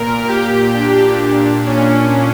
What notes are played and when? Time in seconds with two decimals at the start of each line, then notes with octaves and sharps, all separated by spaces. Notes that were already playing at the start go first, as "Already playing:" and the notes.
Already playing: A#2 A#4
0.27 A#2 G4
0.73 D4
1.19 A#2
1.66 C#4